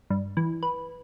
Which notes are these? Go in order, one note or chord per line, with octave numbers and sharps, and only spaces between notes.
G2
E3
B4